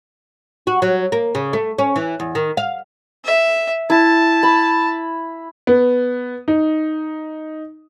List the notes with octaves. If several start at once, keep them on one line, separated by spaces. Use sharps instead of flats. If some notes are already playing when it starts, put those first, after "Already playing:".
F#4
F#3
A#3
C#3
A3
C#4
E3
E2
D#3
F5
E5
E4 A5
B5
B3
D#4